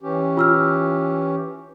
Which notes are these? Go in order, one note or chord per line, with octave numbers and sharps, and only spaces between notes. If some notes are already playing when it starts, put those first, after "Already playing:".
E3 C#4 G4
F4 E6 F6